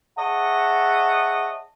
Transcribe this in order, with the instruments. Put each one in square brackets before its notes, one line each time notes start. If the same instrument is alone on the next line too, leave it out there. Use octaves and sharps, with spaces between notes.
[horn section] G#4 C#5 D#5 E5 F#5 A5